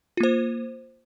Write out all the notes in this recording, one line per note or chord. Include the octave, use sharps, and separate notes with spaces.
A#3 F4 C5